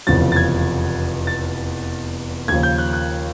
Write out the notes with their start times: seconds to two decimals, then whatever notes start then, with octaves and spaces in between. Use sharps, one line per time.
0.07 F1 E2 C#3 F3 A6
0.32 A6
0.36 G#6
1.27 A6
2.48 D#2 C#3 F3 G#6
2.63 G6
2.78 F#6
2.93 F#6